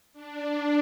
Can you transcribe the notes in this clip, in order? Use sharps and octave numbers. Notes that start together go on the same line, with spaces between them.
D4